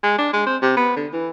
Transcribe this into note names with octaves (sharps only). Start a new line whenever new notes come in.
G#3
D4
G#3
C4
C3
B3
D3
E3